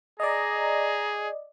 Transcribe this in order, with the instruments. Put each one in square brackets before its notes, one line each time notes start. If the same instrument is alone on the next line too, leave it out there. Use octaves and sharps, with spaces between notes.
[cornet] G#4 [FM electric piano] D5 D#5 [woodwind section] A#5